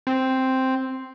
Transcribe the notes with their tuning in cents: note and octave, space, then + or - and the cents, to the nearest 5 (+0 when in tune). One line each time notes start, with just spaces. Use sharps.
C4 +0